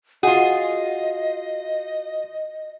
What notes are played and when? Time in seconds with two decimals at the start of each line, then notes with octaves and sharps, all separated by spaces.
0.23 F4 F#4 G#4 D#5 F#5